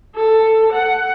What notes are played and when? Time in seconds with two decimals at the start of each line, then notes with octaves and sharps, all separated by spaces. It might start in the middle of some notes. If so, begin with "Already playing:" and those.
0.15 A4
0.72 F#5